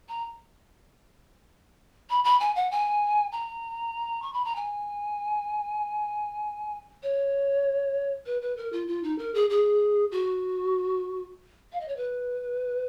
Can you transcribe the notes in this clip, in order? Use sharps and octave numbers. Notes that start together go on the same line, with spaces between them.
A#5
B5
B5
G#5
F#5
G#5
A#5
C#6
B5
A#5
G#5
C#5
B4
B4
A#4
F4
F4
D#4
A#4
G#4
G#4
F#4
F5
D#5
C#5
B4